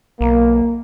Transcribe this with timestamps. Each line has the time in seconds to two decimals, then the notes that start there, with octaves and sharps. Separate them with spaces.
0.21 B1 A#3